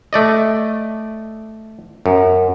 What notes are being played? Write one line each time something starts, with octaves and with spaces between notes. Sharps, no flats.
A3 D5 D#5
F#2